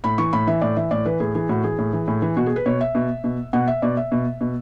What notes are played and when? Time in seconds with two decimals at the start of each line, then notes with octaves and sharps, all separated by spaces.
0.04 A2 B5
0.18 E3 C#6
0.33 A2 B5
0.47 E3 E5
0.62 A2 D5
0.77 E3 E5
0.91 A2 D5
1.06 E3 B4
1.20 A2 G#4
1.35 E3 G#4
1.49 A2 F#4
1.64 E3 G#4
1.78 A2
1.93 E3
2.08 A2
2.22 E3
2.37 B2 F#4
2.46 G#4
2.56 B4
2.66 B2 C#5
2.81 E5
2.95 B2
3.24 B2
3.53 B2 F#5
3.68 E5
3.82 B2 D5
3.97 E5
4.12 B2
4.41 B2